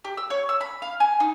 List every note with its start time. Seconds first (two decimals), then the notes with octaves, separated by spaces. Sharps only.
0.05 G4
0.17 E6
0.30 C#5
0.49 E6
0.61 B5
0.82 F5
1.00 G#5
1.20 D#4